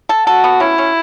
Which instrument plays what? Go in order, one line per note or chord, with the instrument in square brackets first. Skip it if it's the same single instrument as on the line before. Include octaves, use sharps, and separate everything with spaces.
[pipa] A4
[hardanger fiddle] F#4 [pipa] A4
[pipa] B3
[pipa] C#4 [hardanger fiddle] E4
[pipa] C#4